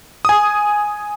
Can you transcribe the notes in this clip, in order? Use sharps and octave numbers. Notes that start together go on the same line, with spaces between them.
G#5 D#6